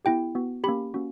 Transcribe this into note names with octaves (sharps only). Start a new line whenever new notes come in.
B3 E4 G4 G5
B3 F#4
A#3 C#4 G4 B5
A#3 C#4 F#4